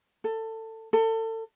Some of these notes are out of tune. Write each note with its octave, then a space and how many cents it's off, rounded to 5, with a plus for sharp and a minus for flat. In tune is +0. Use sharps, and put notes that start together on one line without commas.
A4 +20
A4 +30